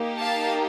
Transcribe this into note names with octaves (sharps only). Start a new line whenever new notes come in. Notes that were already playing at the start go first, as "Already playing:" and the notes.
Already playing: A#3 D#4 G4
F5 A5